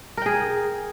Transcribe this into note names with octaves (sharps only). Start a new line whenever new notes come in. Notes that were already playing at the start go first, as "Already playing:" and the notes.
G#4 A#4 G5